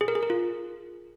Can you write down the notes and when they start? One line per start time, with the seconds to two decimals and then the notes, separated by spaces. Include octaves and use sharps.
0.01 G#4
0.08 A#4
0.15 G#4
0.23 A#4
0.30 F4